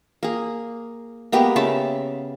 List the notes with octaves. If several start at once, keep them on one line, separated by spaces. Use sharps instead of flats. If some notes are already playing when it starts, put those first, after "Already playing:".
A#3 G#4
G#3 A#3 B3 G4
C#3 E5 A5